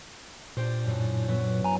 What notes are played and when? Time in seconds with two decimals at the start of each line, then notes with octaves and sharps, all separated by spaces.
0.57 A#2 D4 G4 C5
0.85 F#2 A2
1.28 F#3 B3 E4
1.64 G#5 A#5